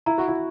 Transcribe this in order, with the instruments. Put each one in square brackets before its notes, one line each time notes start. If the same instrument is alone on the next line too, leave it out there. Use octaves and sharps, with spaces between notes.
[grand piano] E4 [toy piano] A#5
[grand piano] F#4
E4